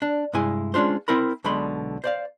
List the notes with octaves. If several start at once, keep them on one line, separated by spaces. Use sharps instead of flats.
D4
G2 C3 G#3 E4 G#5
G#3 C#4 D4 F4 C5
C4 E4 A#4 B5
B1 B2 D3 G#3 B5 C6
C5 D5 F5